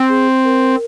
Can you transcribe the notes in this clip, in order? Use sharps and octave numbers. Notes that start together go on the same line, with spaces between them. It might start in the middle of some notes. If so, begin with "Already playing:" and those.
Already playing: C4
G#4
A#4